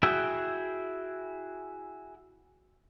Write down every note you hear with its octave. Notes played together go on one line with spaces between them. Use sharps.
E4 F#4 G#4 E5 G5